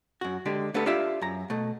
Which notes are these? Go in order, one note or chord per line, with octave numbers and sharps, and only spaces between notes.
F#2 F#4
D3 G#3 G4
A3 B3 D4 G4 A4
D4 F4 G4 E5
F#2 A#5
B2 A3